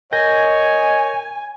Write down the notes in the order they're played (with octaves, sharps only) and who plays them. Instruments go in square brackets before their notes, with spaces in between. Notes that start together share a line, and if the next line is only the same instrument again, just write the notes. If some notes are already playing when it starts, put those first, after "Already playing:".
[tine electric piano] A#4 G6 A#6 [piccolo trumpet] C#5 [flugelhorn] D#5 [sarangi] G#5